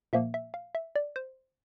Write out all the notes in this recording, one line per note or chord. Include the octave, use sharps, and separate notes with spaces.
A#2 F3 A#3 E5
E5
F5
E5
D5
C5